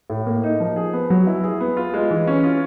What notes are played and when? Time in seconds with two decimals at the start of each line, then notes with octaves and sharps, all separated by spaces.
0.10 A2
0.26 A#3
0.43 D#4
0.60 F3
0.76 G#4
0.93 B3
1.10 F#3
1.27 E4
1.44 G#4
1.60 B3
1.77 F4
1.94 G#3
2.11 E3
2.27 C#4
2.44 F4